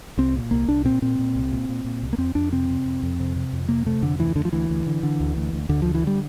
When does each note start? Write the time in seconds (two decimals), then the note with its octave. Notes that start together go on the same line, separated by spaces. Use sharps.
0.17 C2 C4
0.35 A#2
0.51 C2 A#3
0.68 C2 D4
0.84 A#2 C4
1.02 A#2 C4
1.19 A#2
1.35 C2
1.52 A#2
1.69 A#2
1.85 A#2
2.02 C2
2.13 A#3
2.18 F2 C4
2.35 F2 D4
2.52 C3 C4
2.69 C3
2.85 F2
3.03 F2
3.19 C3
3.36 C3
3.53 F2
3.68 C3 A#3
3.86 C3 A3
4.02 F2 D3
4.19 D2 E3
4.36 D2 D3
4.45 F3
4.53 D2 E3
4.70 D2
4.87 D3
5.03 D3
5.20 D2
5.37 D2
5.53 D2
5.69 D2 D3
5.82 D3 F3
5.95 E3
6.04 D3 G3